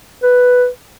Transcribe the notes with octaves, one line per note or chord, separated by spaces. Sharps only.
B4